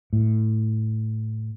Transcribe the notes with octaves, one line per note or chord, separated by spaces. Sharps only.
A2